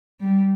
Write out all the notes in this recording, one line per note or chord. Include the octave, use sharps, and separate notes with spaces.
G3